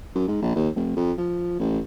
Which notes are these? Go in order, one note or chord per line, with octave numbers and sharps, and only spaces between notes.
F#2
G#2
A#1
D#2
F1
F2
F3
A1